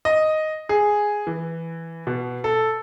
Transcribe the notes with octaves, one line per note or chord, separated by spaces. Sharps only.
D#5
G#4
E3
B2
A4